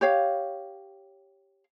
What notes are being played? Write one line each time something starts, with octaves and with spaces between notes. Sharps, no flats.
G4 C#5 F5